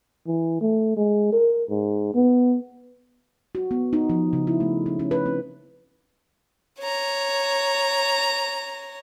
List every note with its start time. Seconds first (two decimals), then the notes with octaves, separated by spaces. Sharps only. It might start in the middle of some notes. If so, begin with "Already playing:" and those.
0.27 E3
0.61 A3
0.97 G#3
1.32 A#4
1.70 G#2
2.14 B3
3.55 F#4
3.71 B3
3.93 D#4
4.10 F3
4.33 C#3
4.47 E4
4.60 A3
4.86 C#4
4.99 C#4
5.11 B4
5.26 C4
6.79 C#5 A#5